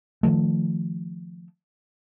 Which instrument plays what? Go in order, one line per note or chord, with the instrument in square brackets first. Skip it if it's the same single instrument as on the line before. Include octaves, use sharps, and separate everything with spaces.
[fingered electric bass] D#3 F3 A3